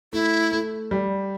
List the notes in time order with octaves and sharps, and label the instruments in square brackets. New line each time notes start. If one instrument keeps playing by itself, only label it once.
[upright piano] A3 [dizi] E4
[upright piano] A3
G3